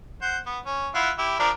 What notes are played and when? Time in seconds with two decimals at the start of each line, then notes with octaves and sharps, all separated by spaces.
0.22 C5 F#5
0.46 B3
0.66 C#4
0.95 E4 F4 F#5
1.18 E4 G4
1.39 F3 D4 A#4